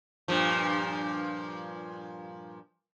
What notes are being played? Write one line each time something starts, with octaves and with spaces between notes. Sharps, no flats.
G2 A#2 F3